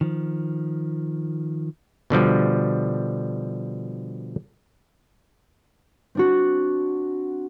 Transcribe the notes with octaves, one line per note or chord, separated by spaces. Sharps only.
D#3 F3
B2 D3 F3 G3
C4 D4 F#4